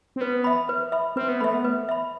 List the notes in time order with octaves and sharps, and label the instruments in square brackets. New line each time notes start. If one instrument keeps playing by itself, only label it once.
[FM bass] C4
[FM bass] B3 [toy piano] B4
[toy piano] E5 B5
B4
E5 B5
[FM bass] C4 [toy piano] B4
[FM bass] B3
[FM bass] A3 [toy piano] E5 B5
[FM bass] B3
[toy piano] B4
E5 B5